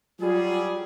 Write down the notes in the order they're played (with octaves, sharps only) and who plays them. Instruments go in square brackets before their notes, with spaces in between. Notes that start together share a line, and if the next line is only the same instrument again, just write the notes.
[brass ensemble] F#3 G3 G#4 [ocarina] F4